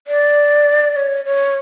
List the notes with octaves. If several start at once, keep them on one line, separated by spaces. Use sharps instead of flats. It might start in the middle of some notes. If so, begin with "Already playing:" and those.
D5
C#5
C#5